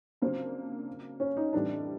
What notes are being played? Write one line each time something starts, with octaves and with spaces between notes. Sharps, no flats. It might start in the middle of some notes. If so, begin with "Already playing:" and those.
C#3 F#3 A#3 C4 D4
C#4
D#4
A2 E3 G3 C4 D4 D#4